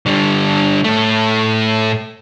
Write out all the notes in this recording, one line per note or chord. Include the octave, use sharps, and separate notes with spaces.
D3 G3
A2 A3